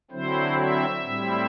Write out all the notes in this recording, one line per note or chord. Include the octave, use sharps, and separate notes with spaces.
D3 F#3 C4 E4 C5
E5
A2 G3 C4 E4